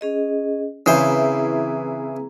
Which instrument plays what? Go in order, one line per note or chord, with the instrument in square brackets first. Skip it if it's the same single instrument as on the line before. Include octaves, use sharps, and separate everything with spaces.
[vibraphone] C#4 G#4 D#5
[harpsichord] C#3 C5 [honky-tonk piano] E3 E4 [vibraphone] C4 G#4 A#5